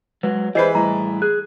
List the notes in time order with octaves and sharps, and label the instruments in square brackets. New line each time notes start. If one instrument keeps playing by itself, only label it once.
[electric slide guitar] F#3 G#3 [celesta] B4
[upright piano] E3 G#3 B4 [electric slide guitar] G4 C5 D5 [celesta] D#5 C7
[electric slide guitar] A2 G3 D#5 [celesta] A#5
[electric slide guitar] G#4 [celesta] F#6